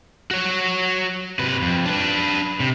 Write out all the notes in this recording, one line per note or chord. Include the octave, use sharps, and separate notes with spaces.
F#4 C#5
C3 B4
F2
D4 B4
C3